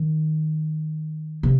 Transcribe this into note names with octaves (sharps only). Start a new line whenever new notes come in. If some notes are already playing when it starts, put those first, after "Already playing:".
Already playing: D#3
C3